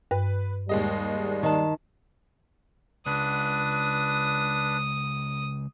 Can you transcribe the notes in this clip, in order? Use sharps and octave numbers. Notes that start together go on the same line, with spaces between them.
G2 B4
D#2 G3 G#3 D#5
D#3 A5
C#2 D4 B4 D#6